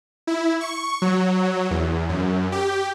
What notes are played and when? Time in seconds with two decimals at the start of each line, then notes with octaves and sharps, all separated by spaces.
0.27 E4
0.61 C#6
1.02 F#3
1.70 E2
2.09 F#2
2.52 G4